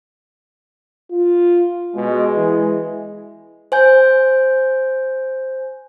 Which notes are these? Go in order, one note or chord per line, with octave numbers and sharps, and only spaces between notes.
F4
B2 G#3
E3
C5 G#5 G6